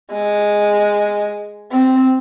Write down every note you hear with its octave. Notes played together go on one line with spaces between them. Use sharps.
G#3
C4